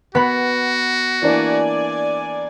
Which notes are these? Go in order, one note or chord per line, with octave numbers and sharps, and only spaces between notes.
B3 F#4 B5
E3 A#3 D4 D5 G#5